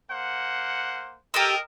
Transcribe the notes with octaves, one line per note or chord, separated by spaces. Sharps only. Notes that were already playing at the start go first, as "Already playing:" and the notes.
A#3 C5 F#5
G4 A4 A#4 D#5 E6